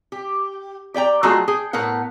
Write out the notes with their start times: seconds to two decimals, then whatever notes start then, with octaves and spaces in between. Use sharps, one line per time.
0.12 G4
0.94 G4 D5 G5 A#5
1.23 F#3 G#3 A3 F4 F#4 G#4
1.48 G#4 G5
1.73 A2 B3 A#4 F#5